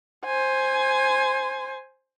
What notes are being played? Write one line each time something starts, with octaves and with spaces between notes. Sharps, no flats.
C5 G#5